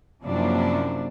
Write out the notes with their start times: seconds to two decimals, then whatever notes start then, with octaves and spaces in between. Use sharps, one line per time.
0.24 F#2 C3 F3 A#3 D4 E4